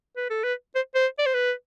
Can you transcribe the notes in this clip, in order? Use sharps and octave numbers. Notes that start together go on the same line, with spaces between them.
B4
A4
B4
C5
C5
D5
C5
B4